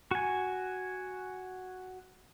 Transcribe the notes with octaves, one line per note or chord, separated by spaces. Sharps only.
F#4 G#5